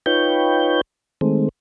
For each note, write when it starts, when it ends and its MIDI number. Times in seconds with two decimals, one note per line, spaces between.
0.06 0.81 63
0.06 0.81 65
0.06 0.81 71
0.06 0.81 73
0.06 0.81 79
0.06 0.81 91
1.21 1.49 51
1.21 1.49 56
1.21 1.49 57
1.21 1.49 60